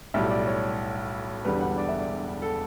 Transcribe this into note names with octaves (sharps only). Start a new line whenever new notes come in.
B1 A2 G3 E5
D5
C#5
E1 E2 D3 G3 B4
F#5
D5
E5
D5
A4